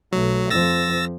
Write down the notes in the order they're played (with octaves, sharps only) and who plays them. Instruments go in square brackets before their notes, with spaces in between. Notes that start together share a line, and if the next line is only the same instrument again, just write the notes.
[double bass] B1 A3 [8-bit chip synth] F#3
[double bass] F2 F3 [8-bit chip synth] E6 A6 A#6